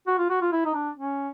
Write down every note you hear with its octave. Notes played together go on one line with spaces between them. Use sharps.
F#4
F4
F#4
F4
E4
D#4
D4
C#4